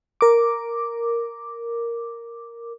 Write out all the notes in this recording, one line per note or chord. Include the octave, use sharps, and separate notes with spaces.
A#4 D6